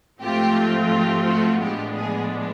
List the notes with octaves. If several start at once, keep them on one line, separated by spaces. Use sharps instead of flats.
G#2 F3 A3 C4 F4 G4
G4
F#4
A2 F3 G#3 B3 D4 G4
G#4